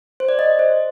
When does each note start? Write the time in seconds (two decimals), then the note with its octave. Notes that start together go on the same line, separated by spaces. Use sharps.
0.20 C5
0.29 D5
0.39 D#5
0.59 C5